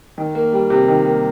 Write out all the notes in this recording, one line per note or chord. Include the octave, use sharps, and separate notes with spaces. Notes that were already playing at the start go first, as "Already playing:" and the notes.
D#3
A#3
G3
C3
D#3
A#3